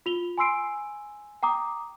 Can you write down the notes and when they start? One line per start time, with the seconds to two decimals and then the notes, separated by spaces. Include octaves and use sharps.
0.06 F4 F7 G7
0.38 G#5 B5 C6 E6 C7 D7
1.43 G5 A#5 D6 D#6